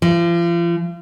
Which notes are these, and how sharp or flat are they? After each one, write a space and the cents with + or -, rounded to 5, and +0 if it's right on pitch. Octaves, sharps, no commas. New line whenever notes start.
F3 -40